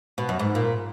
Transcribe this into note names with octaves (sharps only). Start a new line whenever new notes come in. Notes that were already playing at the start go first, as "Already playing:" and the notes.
B2
F#2
G#2
A#2